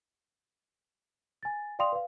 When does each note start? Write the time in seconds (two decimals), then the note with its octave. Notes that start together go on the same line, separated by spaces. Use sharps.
1.43 G#5 A6
1.79 D5 F5 G5 C6 D#6 F7
1.92 B4 F5